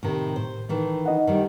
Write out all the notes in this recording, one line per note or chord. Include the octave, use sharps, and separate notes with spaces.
A2 C3 D#3
A2 C5
D#3 E3 A3
D#4 D#5 F#5
D#3 G3 A3